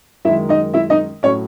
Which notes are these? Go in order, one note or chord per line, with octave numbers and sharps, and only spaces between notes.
F#2 D#3 G#3 E4 E5
D#4 D#5
E4 E5
D#4 D#5
A2 F#3 C#4 C#5